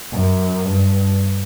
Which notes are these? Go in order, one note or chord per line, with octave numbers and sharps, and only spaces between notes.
F#2
G2